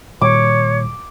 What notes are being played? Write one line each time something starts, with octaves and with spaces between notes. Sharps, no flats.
A#2 D#3 G3 C#5 D6